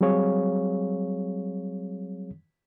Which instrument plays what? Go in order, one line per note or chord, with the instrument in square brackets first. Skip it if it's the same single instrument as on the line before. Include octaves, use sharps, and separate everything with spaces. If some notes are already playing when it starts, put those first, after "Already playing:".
[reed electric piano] F#3 G3 C4 G#4 C#5 F5